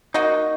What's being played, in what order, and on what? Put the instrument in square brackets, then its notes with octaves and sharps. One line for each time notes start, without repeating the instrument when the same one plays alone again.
[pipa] A#3 F#4 D#5 [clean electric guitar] D#4